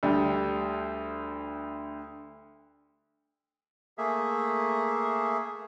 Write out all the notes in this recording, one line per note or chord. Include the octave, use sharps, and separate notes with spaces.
D2 G3
A3 A#3 G#4 E5